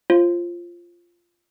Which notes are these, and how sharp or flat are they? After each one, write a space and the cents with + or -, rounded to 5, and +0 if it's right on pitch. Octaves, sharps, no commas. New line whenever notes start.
F4 -10 C5 +30